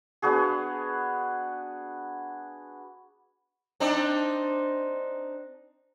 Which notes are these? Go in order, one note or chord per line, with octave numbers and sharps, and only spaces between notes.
B3 D4 F#4 G#4
C4 D4 D#4